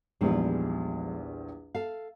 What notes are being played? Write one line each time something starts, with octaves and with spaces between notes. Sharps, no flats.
A#1 E2 F3 G3 G#3 D#4
A4 F5